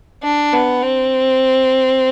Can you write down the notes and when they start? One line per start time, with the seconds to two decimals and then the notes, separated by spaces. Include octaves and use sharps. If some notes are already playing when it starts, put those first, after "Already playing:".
0.23 D4
0.53 B3
0.83 C4